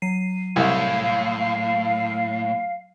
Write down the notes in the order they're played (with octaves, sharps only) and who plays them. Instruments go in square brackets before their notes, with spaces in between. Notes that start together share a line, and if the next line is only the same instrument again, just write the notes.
[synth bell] F#3 C7 D#7
[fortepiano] C2 [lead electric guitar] A2 [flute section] F5